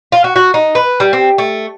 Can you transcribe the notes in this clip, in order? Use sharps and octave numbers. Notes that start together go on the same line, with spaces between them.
F4
F#4
F#4
D#4
B4
G3
C4
A3